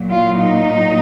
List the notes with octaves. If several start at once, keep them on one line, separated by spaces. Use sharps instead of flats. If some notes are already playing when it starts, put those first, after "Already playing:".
Already playing: A#2 F#3
F4
D#4